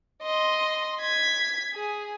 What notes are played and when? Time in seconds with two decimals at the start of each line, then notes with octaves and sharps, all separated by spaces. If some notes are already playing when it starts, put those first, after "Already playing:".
0.23 D#5 C6
1.01 G#6 B6
1.74 G#4